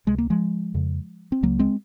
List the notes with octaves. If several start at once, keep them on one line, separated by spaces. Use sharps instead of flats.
C#2 C3 G#3
A#3
F3 G#3
F2 C#3
C4
C#2 C#3 F#3 A#3
G#3 C4